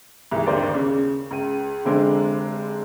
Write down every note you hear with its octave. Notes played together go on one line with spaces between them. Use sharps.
C2 G#2 E3
G1 D#2 C5 D5
C#3
C#2 D#7
F1 D3 G#3 C4 D4